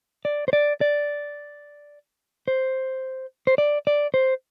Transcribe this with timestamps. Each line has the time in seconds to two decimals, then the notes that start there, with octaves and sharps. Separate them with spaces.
0.25 D5
0.48 C5
0.53 D5
0.81 D5
2.48 C5
3.47 C5
3.58 D5
3.87 D5
4.14 C5